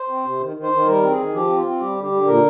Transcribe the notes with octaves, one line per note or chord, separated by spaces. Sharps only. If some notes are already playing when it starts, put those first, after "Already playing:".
Already playing: C5
C4
C3
D#3
D#3
C5
D#3
G3 A#4
C4
G#4
D#3
F3 G4
C4
F4
C4
G3 G4
D3
G4
D3
A#2 A#4